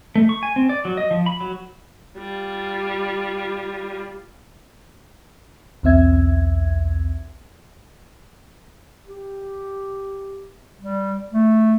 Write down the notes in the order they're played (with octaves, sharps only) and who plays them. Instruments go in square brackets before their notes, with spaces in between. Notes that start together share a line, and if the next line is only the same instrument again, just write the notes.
[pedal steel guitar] A3
C#6
G#5
C4
D5
F#3
D#5
F3
B5
F#3
[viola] G3 F4
[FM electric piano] B1 E2 C4 E5 G#6
[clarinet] G4
G3
A3